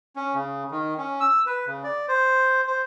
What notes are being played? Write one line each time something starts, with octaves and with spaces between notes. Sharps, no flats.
C#4
C#3
D#3
C#4
E6
B4
C#3
D5
C5
C5